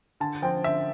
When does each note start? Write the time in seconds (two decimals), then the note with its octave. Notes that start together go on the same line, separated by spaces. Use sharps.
0.20 D3 A5
0.42 F3 C4 G5
0.64 D3 E5